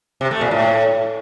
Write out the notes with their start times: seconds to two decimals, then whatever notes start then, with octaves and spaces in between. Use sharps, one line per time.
0.21 C3
0.31 A3
0.41 A#2
0.51 A2